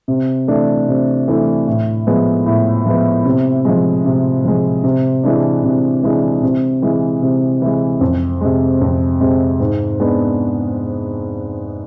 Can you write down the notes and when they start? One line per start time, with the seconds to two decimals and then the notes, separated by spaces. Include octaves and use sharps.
0.08 C3
0.48 E3 A3 D4
0.88 C3
1.28 E3 A3 D4
1.67 A2
2.07 F3 G#3 B3
2.46 A2
2.86 F3 G#3 B3
3.25 C3
3.65 F3 G#3
4.05 C3
4.45 F3 G#3
4.84 C3
5.23 E3 G#3 D4
5.64 C3
6.03 E3 G#3 D4
6.43 C3
6.82 E3 G#3
7.22 C3
7.62 E3 G#3
8.01 F2
8.41 C3 G#3
8.81 F2
9.21 C3 G#3
9.60 G#2
10.00 G#3 B3 D4